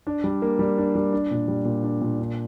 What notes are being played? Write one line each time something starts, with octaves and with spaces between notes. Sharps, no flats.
D4
G3
A#3
G3
D4
G3
D4
A#2
G3
A#2
D4
A#2
D4